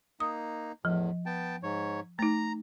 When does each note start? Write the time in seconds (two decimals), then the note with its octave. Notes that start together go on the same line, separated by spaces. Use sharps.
0.20 A#3 D#4 D#6
0.85 E2 A2 F3
1.26 B3 G5 A5
1.63 G#2 C#5
2.19 A3 D#4 A#5